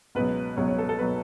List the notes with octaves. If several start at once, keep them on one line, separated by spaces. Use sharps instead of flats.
C#2 B2 F#3 B4
C#2 B2 F#3 C#5
C#5
A4
A4
B2 F#3 B4